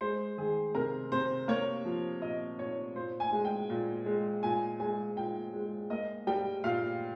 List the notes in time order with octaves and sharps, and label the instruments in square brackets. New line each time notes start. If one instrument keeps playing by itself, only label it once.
[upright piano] G#3 C5
D#3 G#4
C3 A#4
C3 C5
A#3 C#5
F3
A#2 D#5
A#2 C#5
A#2 C5
G#5
G#3
G5
A#2
G#3
A#2 G#5
G#3 G#5
A#2 G5
G#3
A#3 D#5
G3 G5
A#2 F5